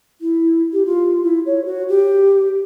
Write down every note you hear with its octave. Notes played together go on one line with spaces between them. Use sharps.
E4
G4
F4
E4
C#5
F#4
G4